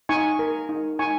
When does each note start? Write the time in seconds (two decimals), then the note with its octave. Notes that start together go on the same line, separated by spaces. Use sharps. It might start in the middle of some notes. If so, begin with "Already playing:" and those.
0.09 D#4 G#5 C#6
0.39 A#4
0.69 D#4
0.99 D#4 G#5 C#6